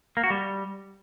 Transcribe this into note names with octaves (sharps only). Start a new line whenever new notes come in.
A#3
F#4
G3